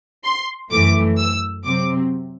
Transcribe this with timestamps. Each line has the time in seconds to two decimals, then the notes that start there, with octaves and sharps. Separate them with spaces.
0.24 C6
0.71 F#2 E3 A3 D6
1.18 E6
1.65 C3 F#3 C4 D6